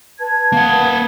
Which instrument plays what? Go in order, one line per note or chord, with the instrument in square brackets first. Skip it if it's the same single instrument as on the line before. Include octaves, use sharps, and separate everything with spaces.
[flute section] B4 A5 G#6
[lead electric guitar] A#3 F#5